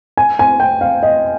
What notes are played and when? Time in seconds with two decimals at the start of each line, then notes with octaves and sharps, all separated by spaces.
0.17 G#5
0.39 G#5
0.60 G5
0.81 F5
1.03 D#5